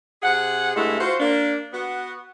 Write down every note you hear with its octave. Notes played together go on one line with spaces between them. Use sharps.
C3 G#4 F#5
G2 G#3 A3 E4
F4 F#4 C5
A#3 D4
B3 F#4